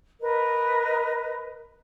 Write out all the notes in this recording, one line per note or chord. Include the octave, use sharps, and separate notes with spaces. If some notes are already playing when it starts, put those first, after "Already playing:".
A#4 B4 D#5